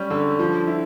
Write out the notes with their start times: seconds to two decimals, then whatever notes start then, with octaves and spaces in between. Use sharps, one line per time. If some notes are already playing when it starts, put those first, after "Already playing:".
Already playing: G3 C#4
0.10 D3
0.39 F3
0.67 E4